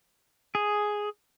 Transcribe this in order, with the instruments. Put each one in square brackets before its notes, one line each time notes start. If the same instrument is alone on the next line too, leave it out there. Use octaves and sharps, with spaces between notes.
[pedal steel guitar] G#4